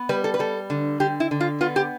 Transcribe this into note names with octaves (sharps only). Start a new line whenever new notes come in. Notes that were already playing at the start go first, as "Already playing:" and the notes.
Already playing: B3
G3 B4
A4
B4
G3 A4
D3
D3 G4
E4
D3
F4
B3 F4
G4